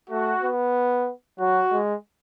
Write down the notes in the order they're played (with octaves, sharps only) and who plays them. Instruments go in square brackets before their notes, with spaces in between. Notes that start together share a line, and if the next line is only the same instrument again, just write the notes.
[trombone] A3 [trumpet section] F#4
[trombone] B3
[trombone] F#3 [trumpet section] F#4
[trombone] G#3